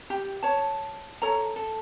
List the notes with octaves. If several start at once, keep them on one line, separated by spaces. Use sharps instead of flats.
G4
C#5 A5
A4 C#5 A#5
A4